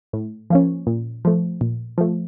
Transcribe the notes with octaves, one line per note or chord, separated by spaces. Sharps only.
A2
F3 A#3 C#4
A#2
F3 A3
A#2
F3 A3